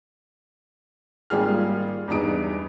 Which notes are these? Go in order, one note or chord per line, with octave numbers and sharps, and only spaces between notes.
G#1 G3 A#3 F4 G#4 F6
E2 G2 D#4 D#6 D7